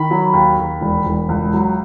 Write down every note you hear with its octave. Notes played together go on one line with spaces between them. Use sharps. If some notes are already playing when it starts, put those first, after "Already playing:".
Already playing: D#3 B5
F#3
D#2
D#2
E1
E1
C#2
F#3